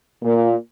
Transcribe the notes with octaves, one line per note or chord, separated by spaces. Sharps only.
A#2